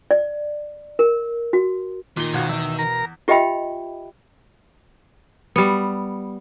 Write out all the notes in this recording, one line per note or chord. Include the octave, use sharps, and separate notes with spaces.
D5
A#4
F#4
A#2 D#3 G7
G#1 B2 F4 F#4
E2 E5
A#4 A#5
F4 G4 D#5 E5 G5 B5
G3 B3